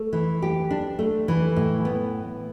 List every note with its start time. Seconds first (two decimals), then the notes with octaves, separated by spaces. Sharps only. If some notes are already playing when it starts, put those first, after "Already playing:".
Already playing: A3
0.13 E3
0.42 G4
0.70 D4
0.99 A3
1.28 E3
1.56 A2
1.85 B3